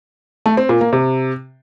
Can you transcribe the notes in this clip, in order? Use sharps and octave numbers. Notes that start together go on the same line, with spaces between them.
A3
C4
A#2
A#3
C3